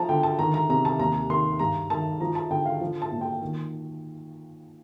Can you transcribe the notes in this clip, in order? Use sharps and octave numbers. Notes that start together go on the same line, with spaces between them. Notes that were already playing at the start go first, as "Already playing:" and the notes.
Already playing: F3 A5 A#5
D3 G5
A5
D#3 A#5
A#5
C3 A#5
A5
D#2 A#5
D#3 C6
G2 A#5
D#3 A5
F3 A#5
A5
D3 G5
F5
F3
A5
A#2
G5
D#3